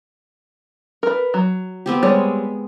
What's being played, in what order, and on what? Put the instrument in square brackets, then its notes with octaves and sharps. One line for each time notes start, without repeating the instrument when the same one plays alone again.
[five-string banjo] A#4 B4
F#3
[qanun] B3 C4 G4
[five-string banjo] G3 C#5 [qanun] G#3